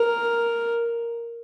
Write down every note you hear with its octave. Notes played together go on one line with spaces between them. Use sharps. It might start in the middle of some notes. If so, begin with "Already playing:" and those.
Already playing: A#4